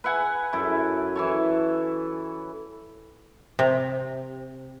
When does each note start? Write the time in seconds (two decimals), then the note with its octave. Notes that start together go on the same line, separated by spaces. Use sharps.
0.04 B4 E5 F#5 G#5
0.53 F#2 E4 A4
1.16 E3 A4 C#5
3.59 C3